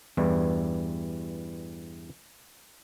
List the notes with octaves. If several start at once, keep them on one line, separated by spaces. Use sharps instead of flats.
E2 G2 E3 G3